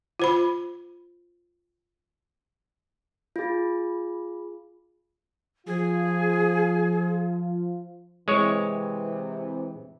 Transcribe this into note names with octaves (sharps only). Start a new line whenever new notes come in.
F4 C5 B5
F4 G#4
F3 F4 G#4
C3 E3 G#3 C#5